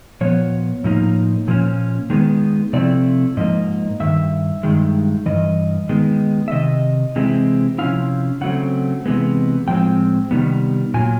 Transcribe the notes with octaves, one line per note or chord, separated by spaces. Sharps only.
A#2 F3 B3 C#5
A2 F3 A#3 D#4
A#2 F3 A#3 C#4
D#3 G#3 B3
C3 F3 A3 C4 E4 D5
G#2 F3 A#3 D#5
G2 D#3 E5
G2 D#3 G#3
G2 E3 D#5
D#3 G#3 B3
E5
C3 D#3 D#5
C3 E3 G#3 C4 E4
C3 F3 A#3 C#4 E4 F5
C#3 F#3 A3 C4 F#5
C3 E3 G#3 B3
A2 F3 G#3 C4 G5
C3 D#3 G3 B3
A#2 F#3 A#3 G#5